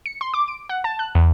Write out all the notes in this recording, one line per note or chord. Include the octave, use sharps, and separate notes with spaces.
C#7
C6
D6
D7
F#5
A5
F#6
E2